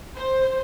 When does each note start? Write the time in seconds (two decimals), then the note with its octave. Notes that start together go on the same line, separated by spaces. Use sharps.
0.16 C5